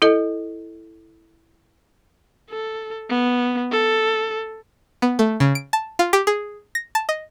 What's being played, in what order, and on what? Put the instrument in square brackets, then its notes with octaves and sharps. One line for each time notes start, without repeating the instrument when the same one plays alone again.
[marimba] E4 A4 D#5
[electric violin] A4
B3
A4
[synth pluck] B3
A3
C#3
D7
A5
F4
G4
G#4
A#6
A5
D#5